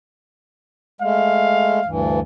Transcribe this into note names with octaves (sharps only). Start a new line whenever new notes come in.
G#3 A3 F5
D2 G2 E3